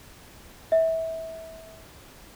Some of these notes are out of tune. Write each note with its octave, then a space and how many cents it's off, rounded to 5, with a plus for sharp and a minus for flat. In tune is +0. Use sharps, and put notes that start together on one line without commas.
E5 -25